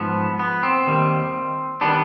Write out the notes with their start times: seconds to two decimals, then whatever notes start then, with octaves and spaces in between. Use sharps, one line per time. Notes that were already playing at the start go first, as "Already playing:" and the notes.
Already playing: G#2 F3 B3
0.39 B3
0.63 C4
0.87 D#2 D#3 G3
1.81 D#3 G3 B3 D4